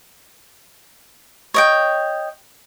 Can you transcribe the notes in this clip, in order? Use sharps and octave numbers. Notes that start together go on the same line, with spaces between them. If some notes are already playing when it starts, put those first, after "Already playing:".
C#5 D#5 G5